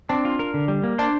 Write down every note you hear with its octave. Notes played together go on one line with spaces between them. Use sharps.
C4 D4
F4
A#4
D3
G3
A#3
D4 C5